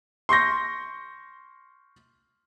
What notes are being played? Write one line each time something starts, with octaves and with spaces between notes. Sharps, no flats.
C6 C#6 G6 A#6